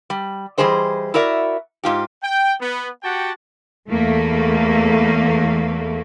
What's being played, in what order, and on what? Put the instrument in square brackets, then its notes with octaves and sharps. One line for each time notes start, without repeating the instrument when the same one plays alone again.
[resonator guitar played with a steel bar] G3
E3 F3 G3 G#4 C5 D#5
E4 F#4 A#4 D5 E5
G#2 F4 G4
[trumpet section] G5
B3
F#4 G4 F#5 G5 A5
[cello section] E2 A3 A#3